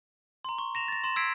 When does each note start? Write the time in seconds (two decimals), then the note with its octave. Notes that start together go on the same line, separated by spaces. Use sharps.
0.45 A#5 C6
0.58 C#6
0.75 A#6 E7 F7
0.88 A6 A#6
1.04 C6 E7
1.16 E6 G#6 B6 C7 D7